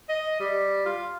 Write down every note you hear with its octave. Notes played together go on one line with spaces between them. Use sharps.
D#5
G3
F4